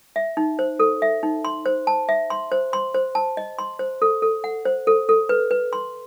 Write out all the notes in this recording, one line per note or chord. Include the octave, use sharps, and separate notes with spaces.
E5
D#4
C5
A4
E5
D#4
C6
C5
A5
E5
C6
C5
C6
C5
A5
D#5
C6
C5
A4
A4
F#5
C5
A4
A4
B4
B4
C6